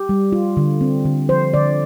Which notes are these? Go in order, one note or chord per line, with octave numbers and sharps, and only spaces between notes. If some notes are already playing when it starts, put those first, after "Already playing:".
Already playing: G4
G3
F4
D3
C4
D3
F3 C5
D3 D5